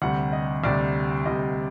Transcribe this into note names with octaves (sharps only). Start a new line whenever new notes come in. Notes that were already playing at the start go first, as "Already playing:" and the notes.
D2 C3 G3 F#5
D#5
D2 C3 G3 D5
D2 C3 G3 D#5